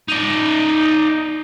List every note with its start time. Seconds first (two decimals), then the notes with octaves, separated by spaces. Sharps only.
0.08 D#4 D5